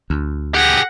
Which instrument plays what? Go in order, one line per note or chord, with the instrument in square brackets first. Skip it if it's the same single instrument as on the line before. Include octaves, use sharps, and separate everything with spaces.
[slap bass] D2
[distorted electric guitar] G4 G#4 [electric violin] F#5 A#6